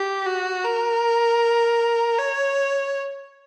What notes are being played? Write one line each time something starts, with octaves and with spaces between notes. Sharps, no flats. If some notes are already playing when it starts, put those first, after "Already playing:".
Already playing: G4
F#4
A#4
C#5